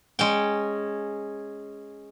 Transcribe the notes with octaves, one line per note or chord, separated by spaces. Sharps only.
G#3 C#4 G5